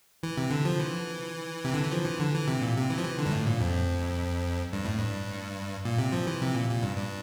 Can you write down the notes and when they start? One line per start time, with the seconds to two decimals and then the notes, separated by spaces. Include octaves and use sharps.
0.23 E3
0.37 C3
0.51 D3
0.65 F3
0.79 E3
1.64 C3
1.73 D3
1.83 E3
1.92 F3
2.05 E3
2.19 D3
2.34 E3
2.48 C3
2.61 A#2
2.77 C3
2.90 E3
2.98 F3
3.04 E3
3.18 D3
3.26 G2
3.31 A2
3.46 A#2
3.61 F2
4.73 G2
4.85 A2
4.98 G2
5.85 A#2
5.99 C3
6.12 F3
6.27 E3
6.41 C3
6.55 A#2
6.70 A#2
6.83 G2
6.97 G2